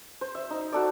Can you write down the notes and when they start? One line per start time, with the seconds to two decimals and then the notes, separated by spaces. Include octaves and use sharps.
0.21 C5
0.35 E5
0.50 D#4
0.72 F#4 A4 D5